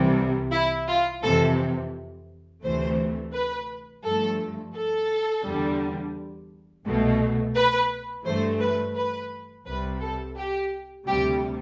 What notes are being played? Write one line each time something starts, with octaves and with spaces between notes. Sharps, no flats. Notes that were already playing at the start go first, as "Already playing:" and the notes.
Already playing: C2 C3 E3 G3
E4
F4
F2 C3 E3 A4
D2 C3 E3 A3 C5
B4
G2 F3 A3 A4
A4
E2 D3 G3
C2 B2 A3
B4
G2 E3 A3 C5
B4
B4
C2 C3 G3 B4
A4
G4
D2 C3 G3 G4